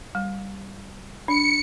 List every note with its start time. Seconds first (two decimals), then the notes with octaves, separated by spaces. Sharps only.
0.15 G3
1.28 D4 C#7